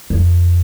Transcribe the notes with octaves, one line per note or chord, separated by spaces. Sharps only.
F2